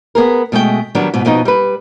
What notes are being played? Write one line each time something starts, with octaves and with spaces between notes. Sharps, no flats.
B3 G#4 A#4
B2 G#3 A3 G5
D#3 F#3 G3 B3 D4
G#2 B2
F2 B2 B3 D#4
G3 B4